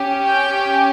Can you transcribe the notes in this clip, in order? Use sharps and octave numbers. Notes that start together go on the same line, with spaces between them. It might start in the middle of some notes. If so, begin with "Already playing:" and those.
Already playing: C#4 G4
G5